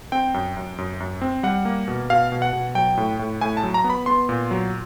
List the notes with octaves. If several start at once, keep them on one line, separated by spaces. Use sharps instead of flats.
C4 G5
F#2
F#2
F#2
F#2
C4
G3 F#5
A#3
B2
B2 F5
B2
F#5
B2
F#3 G5
A2
A2
A2 G#5
A5
F#3
A#5
B3
B5
B3 C6
A#2
F#3